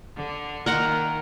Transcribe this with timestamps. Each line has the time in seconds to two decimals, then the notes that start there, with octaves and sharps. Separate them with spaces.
0.16 D3
0.66 D#3 A#3 A#4 F#5 C6